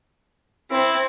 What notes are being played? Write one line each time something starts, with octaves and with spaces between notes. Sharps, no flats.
C4 E4